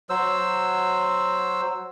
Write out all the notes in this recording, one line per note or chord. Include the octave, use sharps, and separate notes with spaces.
F#3 C5 E6